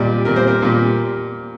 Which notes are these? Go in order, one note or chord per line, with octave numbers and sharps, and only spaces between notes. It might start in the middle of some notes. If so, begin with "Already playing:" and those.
Already playing: A#2 G3 D5 D#5
A#2 G3 A#4
C5
A#4
A#2 G3